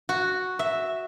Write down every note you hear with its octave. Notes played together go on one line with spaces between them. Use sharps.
F#4
E5